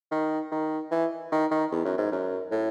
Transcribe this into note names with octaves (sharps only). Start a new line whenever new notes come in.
D#3
D#3
E3
D#3
D#3
E2
F#2
G#2
F#2
A2